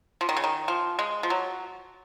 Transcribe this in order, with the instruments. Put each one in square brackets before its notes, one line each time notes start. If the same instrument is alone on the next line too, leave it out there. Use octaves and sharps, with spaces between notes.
[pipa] F3
D#3
C#3
D#3
F3
G#3
F3
F#3